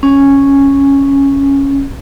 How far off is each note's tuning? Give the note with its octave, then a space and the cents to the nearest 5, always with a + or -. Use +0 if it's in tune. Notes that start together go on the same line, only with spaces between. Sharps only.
C#4 -5